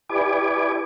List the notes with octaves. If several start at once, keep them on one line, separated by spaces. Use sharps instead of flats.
E4 G4 B4 D5 G#5 D6